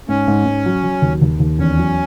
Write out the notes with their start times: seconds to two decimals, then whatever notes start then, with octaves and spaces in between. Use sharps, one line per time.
0.09 G#2 C#4
0.28 G#2
0.46 G#2
0.66 F#3
0.83 F#3
1.02 D#2
1.22 D#2
1.39 D#2
1.59 E2 C#4
1.78 F#3